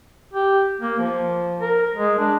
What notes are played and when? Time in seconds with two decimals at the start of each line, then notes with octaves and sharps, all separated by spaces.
0.33 G4
0.81 A#3
0.99 F3
1.61 A#4
1.95 G#3
2.19 D4